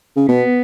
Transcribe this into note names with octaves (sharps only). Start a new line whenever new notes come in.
C#3
B2 B3